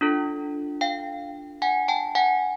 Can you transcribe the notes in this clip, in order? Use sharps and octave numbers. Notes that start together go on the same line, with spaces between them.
D4 F4 A4
F5 G5
F#5 G#5
G5 A5
F#5 G#5